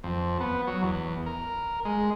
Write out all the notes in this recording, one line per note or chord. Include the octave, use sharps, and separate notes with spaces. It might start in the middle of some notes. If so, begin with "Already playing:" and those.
F2
B3
F#3
E2
A#4
G#3